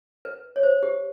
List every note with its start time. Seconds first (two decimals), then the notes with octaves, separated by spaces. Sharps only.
0.25 B4
0.56 C#5
0.63 C5
0.83 G4